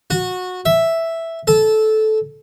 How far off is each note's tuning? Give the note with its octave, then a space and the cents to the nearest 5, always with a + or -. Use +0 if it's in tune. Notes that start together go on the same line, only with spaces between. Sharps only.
F#4 -20
E5 +0
A4 -15